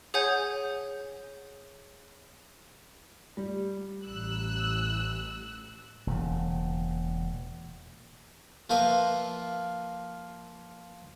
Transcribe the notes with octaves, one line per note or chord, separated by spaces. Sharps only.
G#4 C#5 F#5 G#5 G6
G3
A1 E6 F#6
E1 A#2 C#3
F3 A#3 B4 E5 F5